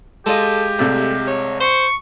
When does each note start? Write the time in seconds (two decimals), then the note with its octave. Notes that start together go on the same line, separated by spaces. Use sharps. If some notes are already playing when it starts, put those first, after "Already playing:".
0.26 G#3 F4 G4 A4 D#5
0.79 C2 C3 A3
1.27 C#5
1.60 C5 C#6